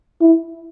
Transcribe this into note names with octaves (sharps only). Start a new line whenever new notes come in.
E4